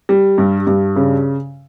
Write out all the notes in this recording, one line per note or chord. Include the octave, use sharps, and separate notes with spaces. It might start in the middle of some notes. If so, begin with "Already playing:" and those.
G3
G2
G2
C#3